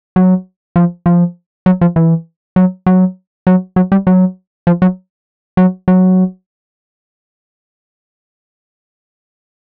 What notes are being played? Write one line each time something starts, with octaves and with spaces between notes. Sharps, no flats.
F#3
F3
F3
F#3
F3
E3
F#3
F#3
F#3
F#3
G3
F#3
F3
F#3
F#3
F#3